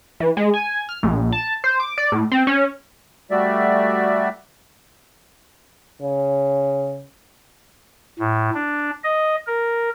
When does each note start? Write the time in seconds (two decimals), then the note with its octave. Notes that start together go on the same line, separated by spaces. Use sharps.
0.20 E3
0.37 G#3
0.54 G#5
0.89 F6
1.03 A#1
1.32 A5
1.64 C5
1.80 D6
1.98 D5
2.12 A2
2.32 C4
2.47 C#4
3.31 G3 A3 F#4 D5 E5
6.02 C#3
8.19 A2
8.54 D4
9.04 D#5
9.47 A#4